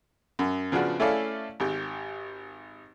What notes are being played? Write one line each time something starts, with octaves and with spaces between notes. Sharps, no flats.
F#2
C#3 F3 B3 D4 F#4
A3 C#4 E4 A4 D5 F5
G#1 G4